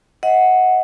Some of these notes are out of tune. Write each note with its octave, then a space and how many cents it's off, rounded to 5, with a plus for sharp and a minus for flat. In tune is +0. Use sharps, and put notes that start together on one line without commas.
D#5 +35 F#5 +0